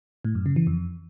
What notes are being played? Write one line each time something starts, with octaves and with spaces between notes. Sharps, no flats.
A2
F#2
C#3
E3
F2